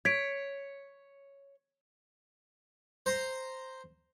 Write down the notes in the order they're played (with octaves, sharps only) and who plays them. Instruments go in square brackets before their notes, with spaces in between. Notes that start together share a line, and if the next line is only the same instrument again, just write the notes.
[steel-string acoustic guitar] C#5 [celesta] G#6 B6 D7
[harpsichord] C5 A#5 C6